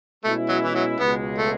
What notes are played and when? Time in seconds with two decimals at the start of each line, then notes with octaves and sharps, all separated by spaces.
0.24 B2 G#3 A3 C#4 E4
0.49 F#3
0.64 E3
0.75 F#3
1.00 C#2 B2 G#3 B3
1.39 A3